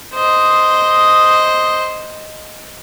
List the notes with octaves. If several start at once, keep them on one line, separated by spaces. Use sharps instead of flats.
C5 D#5